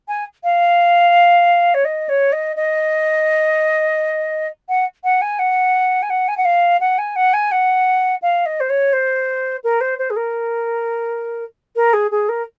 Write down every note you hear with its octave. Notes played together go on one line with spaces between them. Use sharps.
G#5
F5
C#5
D#5
C#5
D#5
D#5
F#5
F#5
G#5
F#5
G#5
F#5
G#5
F#5
F5
F#5
G#5
F#5
G#5
F#5
F5
D#5
C5
C#5
C5
A#4
C5
C5
G#4
A#4
A#4
G#4
G#4
A#4